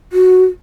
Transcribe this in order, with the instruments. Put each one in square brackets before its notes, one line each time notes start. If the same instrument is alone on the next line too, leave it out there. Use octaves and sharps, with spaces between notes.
[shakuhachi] F#4